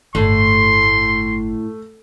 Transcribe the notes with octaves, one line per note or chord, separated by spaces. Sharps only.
G1 A2 A3 C6